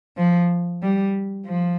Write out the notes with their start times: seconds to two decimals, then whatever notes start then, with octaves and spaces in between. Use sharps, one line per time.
0.17 F3
0.82 G3
1.46 F3